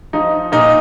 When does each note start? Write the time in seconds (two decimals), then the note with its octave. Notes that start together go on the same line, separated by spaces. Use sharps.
0.13 F3 D#4
0.52 A#2 D#4